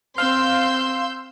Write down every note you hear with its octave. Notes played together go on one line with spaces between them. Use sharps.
C4 F5 C6 E6 G6